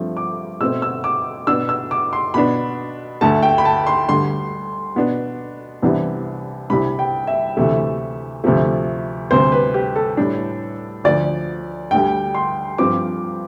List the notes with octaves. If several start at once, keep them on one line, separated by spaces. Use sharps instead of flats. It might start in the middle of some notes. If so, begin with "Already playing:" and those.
Already playing: G2 F3 A3 C4
D6
B2 A3 C4 E6
E6
D6
B2 B3 D4 E6
E6
D6
C6
B2 B3 D4 B5
D2 D3 A3 A5
G5
B5
A5
C6
D2 D3 G3 C6
B2 B3 D4
C2 C3 E3 B3 D4
C2 C3 G3 D4 B5
G5
E5
D2 C3 E3 A3
D2 C3 F3 A3
D2 C3 G3 C4 C5
B4
G4
A4
A2 G3 D4
D2 D3 F3 D5
D2 D3 G3 G5
C6
G2 F3 C4 D6